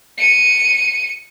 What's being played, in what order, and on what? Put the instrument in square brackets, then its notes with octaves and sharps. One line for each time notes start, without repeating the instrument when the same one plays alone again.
[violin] C#7 D#7